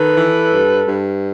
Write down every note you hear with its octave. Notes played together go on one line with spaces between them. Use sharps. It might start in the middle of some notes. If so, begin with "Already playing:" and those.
Already playing: D#3 A4 B4
E3
G2
G2